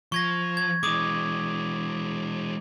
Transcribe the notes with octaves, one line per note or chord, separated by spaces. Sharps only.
F3 C#6 G#6 A#6
G#6
E3 G#3 D6 D#6